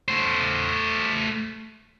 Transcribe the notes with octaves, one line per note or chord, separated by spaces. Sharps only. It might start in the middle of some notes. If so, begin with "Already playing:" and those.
A3 C5